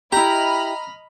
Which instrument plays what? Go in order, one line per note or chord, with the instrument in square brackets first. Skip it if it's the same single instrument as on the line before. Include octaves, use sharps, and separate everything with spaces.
[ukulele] E4 G4 [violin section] D#5 B5 F6 [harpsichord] A#5